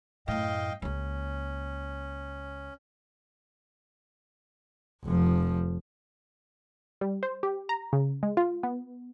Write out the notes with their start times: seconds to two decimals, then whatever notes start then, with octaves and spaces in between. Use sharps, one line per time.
0.28 F#2 A2 D#5 F5 G5
0.82 C#2 A#3 C#4
5.04 F1 F3
7.01 G3
7.23 C5
7.43 G4
7.69 A#5
7.93 C#3
8.23 G#3
8.37 F4
8.63 B3